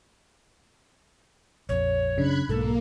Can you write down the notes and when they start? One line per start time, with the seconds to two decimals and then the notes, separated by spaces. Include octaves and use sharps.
1.69 A#1 F2 C#5
2.17 F#2 C#3 D4 B5 F#6 G#6
2.49 B1 G#2 A#3 A4